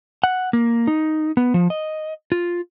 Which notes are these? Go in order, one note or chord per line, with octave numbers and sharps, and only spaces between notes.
F#5
A#3
D#4
B3
F3
D#5
F4